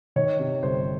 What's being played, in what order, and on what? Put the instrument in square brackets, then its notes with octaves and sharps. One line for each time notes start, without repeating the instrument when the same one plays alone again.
[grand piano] D#3 C#5
C3
G1 C5